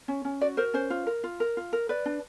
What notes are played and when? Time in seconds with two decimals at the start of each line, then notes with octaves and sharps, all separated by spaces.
0.08 C#4
0.25 C#4
0.41 F#4 D5
0.57 A#4 C5
0.74 C#4 C5
0.90 F4
1.07 A#4
1.24 F4
1.40 A#4
1.57 F4
1.73 A#4
1.89 B4 D5
2.06 D4